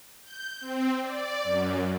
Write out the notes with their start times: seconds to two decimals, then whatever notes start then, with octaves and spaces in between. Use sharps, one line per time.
0.23 G6
0.61 C4
1.01 D5
1.44 F#2